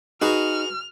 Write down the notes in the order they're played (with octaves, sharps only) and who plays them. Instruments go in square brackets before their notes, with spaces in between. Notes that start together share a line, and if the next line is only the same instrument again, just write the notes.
[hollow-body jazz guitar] D#4 [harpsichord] F#4 G#4 B4 [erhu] F6